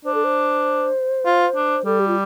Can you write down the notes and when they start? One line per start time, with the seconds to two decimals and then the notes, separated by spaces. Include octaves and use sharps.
0.05 D4 C5
0.14 A4
0.24 C5
1.26 F4
1.56 D4
1.85 G3 A4
2.00 G4
2.08 F4